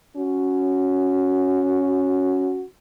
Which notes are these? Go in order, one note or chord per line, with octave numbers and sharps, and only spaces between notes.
C#4 F#4